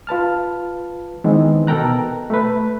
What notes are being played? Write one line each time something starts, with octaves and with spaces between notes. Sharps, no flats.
F4 B4 A5 F6
D#3 E3 G#3 B3 C4 D#4
B2 A4 A#4 G5 A#5 F#6
A3 B4